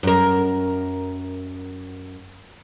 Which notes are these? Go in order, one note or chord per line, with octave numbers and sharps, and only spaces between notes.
F#2 A#4